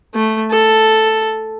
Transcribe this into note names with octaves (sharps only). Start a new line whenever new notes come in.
A3
A4